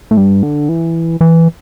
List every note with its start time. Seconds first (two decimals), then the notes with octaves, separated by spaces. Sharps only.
0.11 A2
0.17 G2
0.43 D3
0.69 E3
1.21 E3